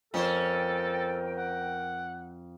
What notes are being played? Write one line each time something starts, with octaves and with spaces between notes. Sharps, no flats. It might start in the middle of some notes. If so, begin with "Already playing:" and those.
F2 C#4 A4 A#4 C5 G5
F#5